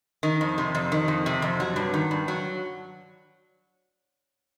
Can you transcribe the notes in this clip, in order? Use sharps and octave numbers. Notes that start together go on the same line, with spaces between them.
D#3
F2
C3
F2
D#3
F2
C3
F2
F#3
G2
D#3
G2
F#3